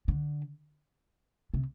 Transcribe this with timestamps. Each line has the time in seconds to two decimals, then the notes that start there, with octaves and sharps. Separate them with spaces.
0.08 D3
1.54 C3